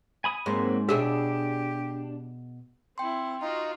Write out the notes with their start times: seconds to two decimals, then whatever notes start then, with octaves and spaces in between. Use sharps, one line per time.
0.24 G#5 B5 D#6
0.46 G#2 F#3 A#3 C4
0.89 B2 D4 G4 G#4 E5
2.98 C4 E4 G5 C6
3.42 D#4 F4 F#4